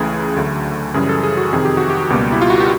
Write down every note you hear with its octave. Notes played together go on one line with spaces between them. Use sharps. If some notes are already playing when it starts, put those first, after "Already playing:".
Already playing: C#2 C#3 E3 A3 G#4
D2 D3 F#3 A3
F#2 C#3 E3 G3 G#4
A4
G#4
F#4
F2 C3 D#3 G#4
G4
F#4
G4
C#2 B2 G3 A#3
E4
F4
F#4
G4